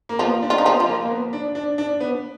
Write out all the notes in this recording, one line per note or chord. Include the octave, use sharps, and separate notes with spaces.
A#3
F3 B3 F4
D4
F4
D#4
F3 B3 F4
F3 F4
A#3
A#3
B3
D4
D4
D4
B3